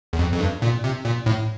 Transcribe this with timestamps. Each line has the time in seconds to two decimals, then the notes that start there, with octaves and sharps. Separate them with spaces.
0.13 E2
0.19 F2
0.33 F2
0.40 G2
0.62 A#2
0.84 C3
1.05 A#2
1.26 A2